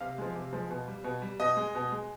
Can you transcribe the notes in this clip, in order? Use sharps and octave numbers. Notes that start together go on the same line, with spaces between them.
C3 F5
F3 G#3
C3
F3 G#3
B2
G3
B2
G3
B2 D#5
G#3
B2
G#3